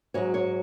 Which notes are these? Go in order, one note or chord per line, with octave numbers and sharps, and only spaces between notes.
G#2 F#3 C#5
C#5